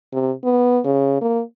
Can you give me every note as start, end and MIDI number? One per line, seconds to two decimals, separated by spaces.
0.13 0.32 48
0.44 0.79 59
0.85 1.19 49
1.21 1.42 58